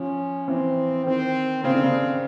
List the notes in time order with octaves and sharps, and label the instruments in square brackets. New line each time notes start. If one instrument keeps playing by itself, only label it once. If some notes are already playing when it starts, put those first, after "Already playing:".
Already playing: [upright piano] F3 [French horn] C#4
[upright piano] E3 [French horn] C4
[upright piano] D#3 [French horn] C4
[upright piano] C#3 [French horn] C4
[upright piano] D3
C#3